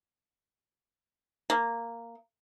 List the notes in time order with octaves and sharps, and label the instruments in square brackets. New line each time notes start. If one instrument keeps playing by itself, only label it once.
[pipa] A#3